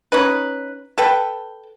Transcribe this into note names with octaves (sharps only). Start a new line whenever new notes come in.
C#4 D#4 B4
A4 B4 G5